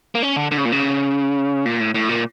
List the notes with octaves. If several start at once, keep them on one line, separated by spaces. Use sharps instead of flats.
A#3
C#4
D3
D3
C#3
A#2
C#3
A#2
A2
A2
A#2